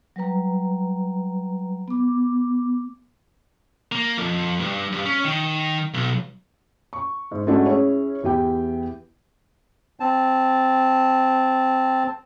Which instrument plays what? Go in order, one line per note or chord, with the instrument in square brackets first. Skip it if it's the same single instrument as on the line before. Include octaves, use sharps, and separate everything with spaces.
[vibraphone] F#3 G3 B4 A#5
B3 D6
[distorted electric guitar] A#3
F2
G2
G2
C#4
D#3
B1
[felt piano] C#6
G#2
G#3 A3 C#4 D4 E4 F#4
C#4 E4 G#4 C#5
E2 E4 G4 G5
[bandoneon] C4 A5